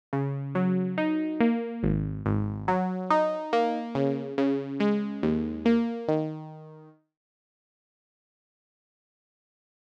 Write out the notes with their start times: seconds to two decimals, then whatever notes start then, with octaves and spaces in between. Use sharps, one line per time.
0.13 C#3
0.55 F#3
0.98 D#4
1.40 A#3
1.83 G#1
2.26 G#1
2.68 F#3
3.10 D#4
3.53 A#3
3.95 C#3
4.38 C#3
4.80 G#3
5.23 D#2
5.65 A#3
6.08 D#3